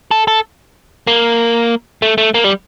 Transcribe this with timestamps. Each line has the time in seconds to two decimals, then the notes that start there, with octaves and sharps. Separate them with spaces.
0.11 A4
0.28 A4
1.07 A#3
2.02 A3
2.18 A3
2.34 A#3
2.44 G3